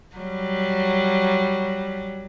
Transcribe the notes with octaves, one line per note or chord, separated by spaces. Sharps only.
F#3 G3